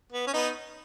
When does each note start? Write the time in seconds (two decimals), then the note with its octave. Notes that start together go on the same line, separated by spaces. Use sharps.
0.13 B3
0.27 C#4
0.34 B3 D#4